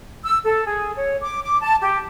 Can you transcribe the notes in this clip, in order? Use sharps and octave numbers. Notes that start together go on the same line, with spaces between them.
E6
A4
G#4
C#5
D6
D6
A5
G4